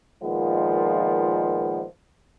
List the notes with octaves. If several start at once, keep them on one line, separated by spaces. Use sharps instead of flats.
A#2 D#3 F3 G#3 B3